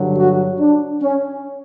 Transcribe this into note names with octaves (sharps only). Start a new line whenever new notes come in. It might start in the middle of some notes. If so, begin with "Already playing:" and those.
Already playing: G2 D3 F#3
F#4
D4
C#4